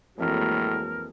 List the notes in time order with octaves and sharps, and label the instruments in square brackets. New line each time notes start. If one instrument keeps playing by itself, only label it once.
[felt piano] F2 E3 [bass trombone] A2 [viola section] F#3 G#3 A#3 [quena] A#4